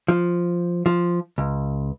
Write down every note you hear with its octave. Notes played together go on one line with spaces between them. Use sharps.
F3
F3
C#2